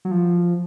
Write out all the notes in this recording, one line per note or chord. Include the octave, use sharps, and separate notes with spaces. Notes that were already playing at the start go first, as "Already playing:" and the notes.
F#3
F3